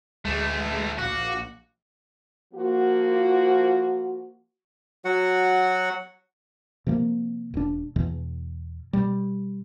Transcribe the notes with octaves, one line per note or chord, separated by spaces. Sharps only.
D2 E3 G#3 A3
A#1 F#4 F5 D6 F#6
F3 A#3 F#4
F#3 F#4 F#5
C3 F3 A#3
E1 D4
E2 B2 E3
B2 G3